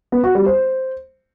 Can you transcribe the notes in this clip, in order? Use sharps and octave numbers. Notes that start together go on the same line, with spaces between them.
B3
F#4
G3
C5